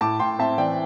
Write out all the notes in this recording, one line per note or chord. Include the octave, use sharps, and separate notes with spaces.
A2 A5 D6
A2 G5 C6
C4 E5 A5
E3 D5 G5